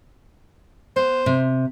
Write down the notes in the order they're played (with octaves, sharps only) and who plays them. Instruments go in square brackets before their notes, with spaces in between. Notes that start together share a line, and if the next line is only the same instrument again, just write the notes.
[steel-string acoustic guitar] B3 [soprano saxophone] C5
[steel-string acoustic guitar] C3